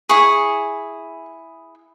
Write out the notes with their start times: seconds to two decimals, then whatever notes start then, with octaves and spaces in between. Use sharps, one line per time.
0.09 E4 G#4 C#6